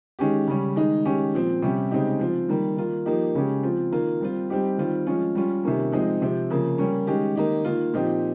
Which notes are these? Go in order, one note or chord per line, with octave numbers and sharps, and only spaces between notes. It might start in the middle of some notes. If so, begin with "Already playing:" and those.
D#3 G#3 C#4 G4
C#3 G3 C#4 G4
D#3 G#3 D#4
D#3 G#3 C#4 G4
A#2 F3 C4
C3 G3 C#4 G4
C#3 G#3 C4 D#4 G4
F3 C4 F4
D#3 G3 A#3
D#3 A#3 F4
F3 A#3 D#4 G4
C#3 G#3 C#4 G4
F3 C4 F4
D#3 A#3 F4
G3 C4 F4
G3 C4 D#4 G4
D#3 G3 C4 F4
F3 G#3 C#4 F4
G3 C#4 F4
C3 D#3 A#3 C#4
F3 G#3 C4 D#4
C3 F3 C4
C#3 F3 A#3
G3 A#3 C#4
D#3 G#3 C#4 G4
D#3 A#3 D#4 G4
D#3 A#3 F4
A#2 F3 C4 D#4 G4